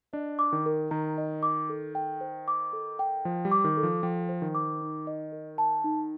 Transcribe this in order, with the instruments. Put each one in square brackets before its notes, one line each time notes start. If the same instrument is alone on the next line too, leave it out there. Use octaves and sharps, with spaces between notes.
[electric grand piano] D4 [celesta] D#5
[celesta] D6
[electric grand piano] D#3
[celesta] A#4
[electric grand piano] D#3 [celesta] A#5
[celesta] D#5
D6
A4
G5
C5
D6
A4
G5
[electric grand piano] F3 [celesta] C5
[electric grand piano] G3
[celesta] D6
[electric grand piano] D#3
[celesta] A4
[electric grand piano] F3
[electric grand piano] F3 [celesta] G5
[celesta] C5
[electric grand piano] D#3
[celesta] D6
D#4
D#5
A#4
A5
D#4